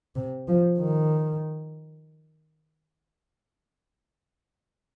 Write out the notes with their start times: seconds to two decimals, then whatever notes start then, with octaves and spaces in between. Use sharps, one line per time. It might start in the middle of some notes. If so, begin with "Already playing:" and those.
0.15 C3
0.48 F3
0.79 D#3